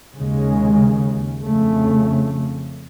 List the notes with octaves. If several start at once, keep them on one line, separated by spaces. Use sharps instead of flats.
D#2 C#3 G#3
F2 C#3 A3